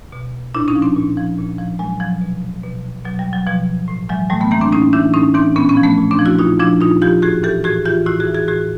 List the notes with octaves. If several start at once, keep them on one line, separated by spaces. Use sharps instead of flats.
B2
A#2 D4 E4
C#4 D#4
F3
C4 D4
A#2
F3
A#2
F3
A#2 F#3 G#3
F3 F#3
B2
B2
B2 F#3
G3
F#3
B2 F3
A2
E3 F#3 G#3
A2 G3 A3
A3 B3
E3 A#3 C4
C4 D4
A2 C#4 D#4
E3 D4 E4
A2 C#4 D#4
E3 C4 D4
A#2 B3 C#4
B3 C#4
F3
A3 B3
A#2
C4 D4
F3
E4 F#4
A#2 D#4 F4
F3 D4 E4
A#2 D#4 F4
F3 F4 G4
A2 F#4 G#4
E3 G4 A4
A2 F#4 G#4
E3 F4 G4
A2 E4 F#4
F#4 G#4
E3
F#4 G#4
A2 F#4 G#4